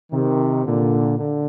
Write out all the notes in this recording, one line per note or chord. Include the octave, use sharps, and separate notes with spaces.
C3 D#3
A#2 D3
D3